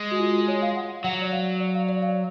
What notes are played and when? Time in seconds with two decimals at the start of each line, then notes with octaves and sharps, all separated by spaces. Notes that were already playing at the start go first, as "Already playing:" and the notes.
Already playing: G#3
0.11 F#4
0.19 F4
0.48 C#5
0.62 F5
0.76 F#5
1.04 F#3 F#5
1.22 D5
1.32 F5
1.60 D5
1.75 F5
1.89 D5
2.02 F5